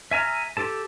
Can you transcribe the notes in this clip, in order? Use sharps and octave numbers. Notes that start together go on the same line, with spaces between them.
E5 G#5 A#5 F6
G4 A4 A5